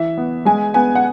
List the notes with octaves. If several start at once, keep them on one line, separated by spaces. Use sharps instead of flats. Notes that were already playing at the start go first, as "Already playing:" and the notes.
Already playing: E3 E5
B3
G#3 G#5
B3 G#5
F#5